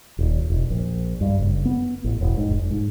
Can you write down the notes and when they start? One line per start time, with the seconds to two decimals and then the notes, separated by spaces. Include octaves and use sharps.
0.19 D#1
0.50 E1
0.70 A#1
1.21 G2
1.39 F#1
1.65 B3
2.04 A1
2.21 E1
2.37 G#2
2.49 F1
2.70 G#2